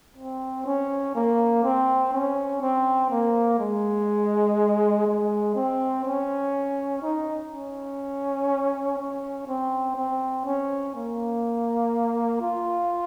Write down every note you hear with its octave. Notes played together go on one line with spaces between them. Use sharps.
C4
C#4
A#3
C4
C#4
C4
A#3
G#3
G#3
C4
C#4
D#4
C#4
C#4
C4
C4
C#4
A#3
F4